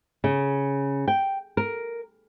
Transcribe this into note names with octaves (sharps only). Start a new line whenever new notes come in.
C#3
G5
A#4